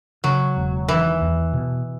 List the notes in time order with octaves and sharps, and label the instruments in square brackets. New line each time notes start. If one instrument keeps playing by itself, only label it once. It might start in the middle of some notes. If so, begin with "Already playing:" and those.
[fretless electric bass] C#3 [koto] F#3
[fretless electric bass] E1
[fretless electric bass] D#3 [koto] E3
[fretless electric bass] E2
B2